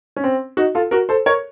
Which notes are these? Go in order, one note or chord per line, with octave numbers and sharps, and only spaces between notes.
C#4
C4
D#4 F#4
F4 A4
F#4 A#4
A4 C5
A#4 C#5